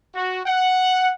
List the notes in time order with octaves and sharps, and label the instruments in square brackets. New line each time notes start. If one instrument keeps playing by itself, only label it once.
[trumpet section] F#4
F#5